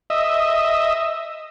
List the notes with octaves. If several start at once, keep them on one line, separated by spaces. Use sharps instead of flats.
D#5 E5